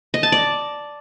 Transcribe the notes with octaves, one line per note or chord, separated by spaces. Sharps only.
D#5
A5
D5